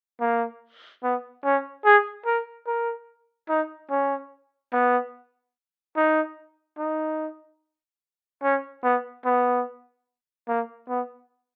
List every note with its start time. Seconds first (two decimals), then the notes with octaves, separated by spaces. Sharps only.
0.21 A#3
1.03 B3
1.44 C#4
1.85 G#4
2.26 A#4
2.67 A#4
3.49 D#4
3.90 C#4
4.73 B3
5.96 D#4
6.78 D#4
8.43 C#4
8.84 B3
9.25 B3
10.48 A#3
10.89 B3